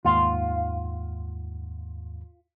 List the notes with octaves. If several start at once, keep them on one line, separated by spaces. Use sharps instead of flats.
D#2 G#2 F4 F#5